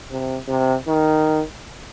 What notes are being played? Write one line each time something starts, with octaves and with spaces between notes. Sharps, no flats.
C3
C3
D#3